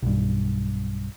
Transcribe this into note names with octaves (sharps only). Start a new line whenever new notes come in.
B1 G2